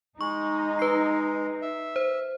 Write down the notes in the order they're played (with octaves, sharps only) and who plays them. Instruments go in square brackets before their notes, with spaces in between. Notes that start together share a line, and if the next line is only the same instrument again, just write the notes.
[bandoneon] G#3 [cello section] D#4 [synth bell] C#6
[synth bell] B4 C7
[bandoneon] E5
[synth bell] C5